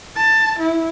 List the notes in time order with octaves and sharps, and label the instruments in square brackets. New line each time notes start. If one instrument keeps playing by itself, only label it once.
[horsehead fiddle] A5
E4